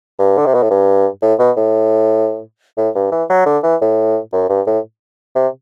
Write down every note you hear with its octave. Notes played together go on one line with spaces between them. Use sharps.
G2
D3
C3
B2
A2
G2
A2
B2
A2
A2
G2
E3
F#3
D3
E3
A2
F#2
G2
A2
C3